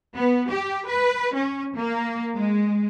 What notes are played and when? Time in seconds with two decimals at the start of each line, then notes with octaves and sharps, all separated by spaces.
0.14 B3
0.50 G4
0.87 B4
1.34 C#4
1.77 A#3
2.36 G#3